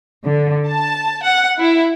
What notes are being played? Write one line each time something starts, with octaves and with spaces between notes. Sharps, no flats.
D3
A5
F#5
E4